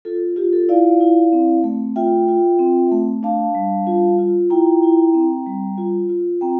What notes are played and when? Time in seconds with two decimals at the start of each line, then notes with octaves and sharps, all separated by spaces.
0.05 F4 A4
0.36 F4 G4
0.53 A4
0.69 E4 D5 F5
1.00 E4
1.33 C4
1.64 A3
1.96 F4 E5 G5
2.28 F4
2.59 C4
2.92 A3
3.23 D4 F5 A5
3.55 G3
3.87 F4
4.19 F4
4.50 E4 G5 A#5
4.83 E4
5.14 C4
5.46 G3
5.78 F4
6.09 F4
6.41 C4 G5 A#5